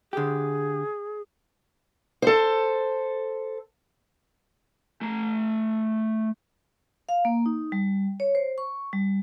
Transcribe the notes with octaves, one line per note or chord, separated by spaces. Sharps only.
D3 G4 G#4
A4 C5
A3 A#5
F5
A#3
D#4
G3
C#5
C5
C#6
G3